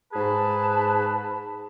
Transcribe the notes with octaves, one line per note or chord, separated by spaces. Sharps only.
G#2 G#4 B4 A5